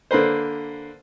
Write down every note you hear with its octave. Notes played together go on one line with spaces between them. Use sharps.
D3 A#3 B4 C5